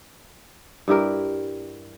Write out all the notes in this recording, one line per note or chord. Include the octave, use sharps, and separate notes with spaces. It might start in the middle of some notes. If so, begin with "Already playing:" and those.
G2 E4 G4 A#4